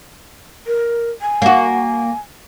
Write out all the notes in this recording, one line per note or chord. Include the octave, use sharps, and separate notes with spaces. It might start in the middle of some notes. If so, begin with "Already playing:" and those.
A#4
G#5
A#3 F#4